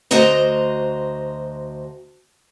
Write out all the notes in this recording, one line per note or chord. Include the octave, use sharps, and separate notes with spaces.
D2 F#4 C5 D#5 A#5